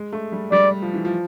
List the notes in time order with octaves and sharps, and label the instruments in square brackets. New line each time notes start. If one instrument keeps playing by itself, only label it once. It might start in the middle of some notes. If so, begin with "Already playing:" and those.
Already playing: [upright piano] G#3
A3
G3
[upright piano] G3 [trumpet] D5
[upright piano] F3
E3
F3